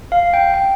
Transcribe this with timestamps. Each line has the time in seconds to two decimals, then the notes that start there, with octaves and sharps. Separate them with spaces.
0.12 F5
0.33 G5
0.54 G5